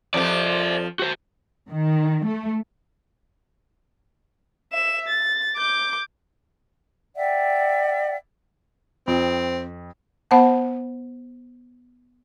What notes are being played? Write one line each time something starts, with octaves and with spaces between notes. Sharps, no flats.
F2 F3 C5 D5
F#4 C5
D#3
A3
E5 E7
A6
D6 G6
D5 E5 F#5 G5
F2 C4
B3 C5 F#5 A5